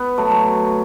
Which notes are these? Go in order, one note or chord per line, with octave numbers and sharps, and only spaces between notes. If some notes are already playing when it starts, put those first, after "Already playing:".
Already playing: B3
F#3 A3
F#3